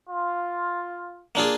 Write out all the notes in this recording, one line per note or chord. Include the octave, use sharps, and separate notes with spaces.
F4
A#3 D4 F4 G#4